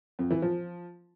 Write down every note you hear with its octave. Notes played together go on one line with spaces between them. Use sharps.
F2
E3
F3